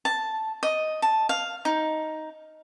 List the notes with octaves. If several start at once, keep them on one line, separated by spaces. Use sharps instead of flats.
A5
D#5
A5
F5
D#4